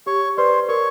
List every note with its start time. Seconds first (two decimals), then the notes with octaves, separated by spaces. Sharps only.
0.06 G4 C#5 C#6
0.37 B4 C5 D5 C6
0.68 A#4 C#5 C#6